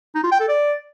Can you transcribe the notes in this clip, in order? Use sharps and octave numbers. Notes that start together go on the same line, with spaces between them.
D#4
F4
G5
A4
D5